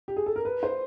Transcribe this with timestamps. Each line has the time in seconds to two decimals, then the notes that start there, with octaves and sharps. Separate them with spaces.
0.08 G4
0.17 G#4
0.26 A4
0.36 A#4
0.45 B4
0.63 C5